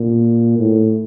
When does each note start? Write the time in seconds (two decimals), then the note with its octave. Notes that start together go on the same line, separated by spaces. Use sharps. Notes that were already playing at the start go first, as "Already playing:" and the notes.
Already playing: A#2
0.59 A2